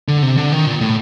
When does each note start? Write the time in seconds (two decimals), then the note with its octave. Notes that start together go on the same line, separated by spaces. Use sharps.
0.08 D3
0.22 C3
0.37 D3
0.52 D#3
0.66 A#2
0.81 A2